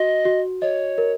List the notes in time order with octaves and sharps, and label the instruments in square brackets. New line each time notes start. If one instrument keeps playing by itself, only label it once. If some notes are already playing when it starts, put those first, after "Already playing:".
Already playing: [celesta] F#4 [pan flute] D#5
[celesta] F#4
[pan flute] C#5 [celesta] D#5
[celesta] A#4